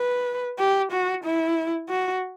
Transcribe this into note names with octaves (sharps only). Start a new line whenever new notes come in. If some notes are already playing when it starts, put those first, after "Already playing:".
Already playing: B4
G4
F#4
E4
F#4